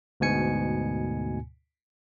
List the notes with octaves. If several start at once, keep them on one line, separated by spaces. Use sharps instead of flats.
D2 G#2 B2 G#5 C#7